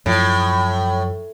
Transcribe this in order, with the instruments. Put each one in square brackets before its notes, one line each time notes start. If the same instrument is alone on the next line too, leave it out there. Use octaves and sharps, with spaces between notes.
[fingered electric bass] F#2 F3 [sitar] A2